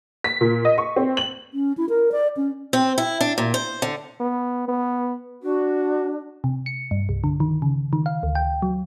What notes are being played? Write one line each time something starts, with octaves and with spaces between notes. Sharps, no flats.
B6
A#2
D#5
C#6
C4
F#7
C#4
E4
A#4
D5
C#4
C4
E4
D4
A#2
C5
D3
B3
B3
D4 F#4
C3
C#7
G2
C2
D3
D#3
C#3
D#3
F5
D2
G5
F#3